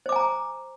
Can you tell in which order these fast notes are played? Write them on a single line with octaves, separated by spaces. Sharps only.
C5 D6 G#5 A#5